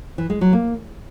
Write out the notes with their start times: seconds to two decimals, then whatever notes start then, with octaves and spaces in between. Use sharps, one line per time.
0.18 E3
0.30 G#3
0.41 F#3
0.53 A#3